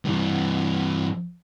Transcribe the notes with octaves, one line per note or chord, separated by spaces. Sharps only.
G2 E3